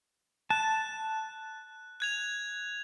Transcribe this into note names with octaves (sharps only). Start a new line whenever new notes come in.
A5 F#6
F#6 G#6 F7